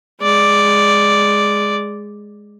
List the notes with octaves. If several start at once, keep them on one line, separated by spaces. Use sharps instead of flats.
G#3 D5